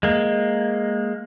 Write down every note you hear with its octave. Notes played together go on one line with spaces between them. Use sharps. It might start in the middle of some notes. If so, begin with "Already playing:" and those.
G#3 A#3